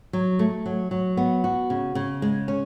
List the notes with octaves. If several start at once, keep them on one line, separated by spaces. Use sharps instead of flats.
F#3
A3
F#3
F#3
B3
F#4
C#3
C#3
G#3
C#4